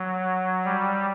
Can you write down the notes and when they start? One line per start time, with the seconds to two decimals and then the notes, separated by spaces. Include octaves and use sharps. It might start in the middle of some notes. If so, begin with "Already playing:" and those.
Already playing: F#3
0.65 G3